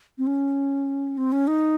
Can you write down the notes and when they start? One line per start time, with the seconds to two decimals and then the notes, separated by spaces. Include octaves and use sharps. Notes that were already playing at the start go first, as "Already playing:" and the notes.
0.18 C4
0.27 C#4
1.18 C4
1.32 C#4
1.47 D#4